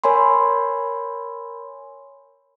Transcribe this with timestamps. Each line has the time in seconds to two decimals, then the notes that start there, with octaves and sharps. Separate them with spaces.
0.04 A#4 C#5 G#5 B5 C6